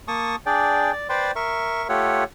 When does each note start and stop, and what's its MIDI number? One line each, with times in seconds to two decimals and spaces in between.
0.08 0.36 58
0.08 0.36 81
0.08 0.36 85
0.08 0.36 87
0.46 0.92 62
0.46 0.92 68
0.46 0.92 74
0.46 0.92 79
0.92 1.07 74
1.09 1.31 71
1.09 1.31 72
1.09 1.31 74
1.09 1.31 79
1.09 1.31 84
1.36 1.87 70
1.36 1.87 76
1.36 1.87 85
1.89 2.24 57
1.89 2.24 65
1.89 2.24 67
1.89 2.24 69
1.89 2.24 73
1.89 2.24 78